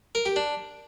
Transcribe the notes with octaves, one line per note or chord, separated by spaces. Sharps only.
A#4
G4
D4